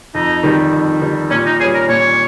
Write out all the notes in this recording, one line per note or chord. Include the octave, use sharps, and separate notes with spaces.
F2 D#4
D#3 G3
F2
D#3 G3
A#2 C#4
D#4
G3 C#4 G#4
A#4
A#2 C#5